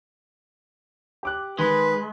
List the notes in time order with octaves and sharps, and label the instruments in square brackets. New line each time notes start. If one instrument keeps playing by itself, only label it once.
[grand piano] G4 D6 F#6
[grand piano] D#3 [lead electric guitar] G#3 [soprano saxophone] B4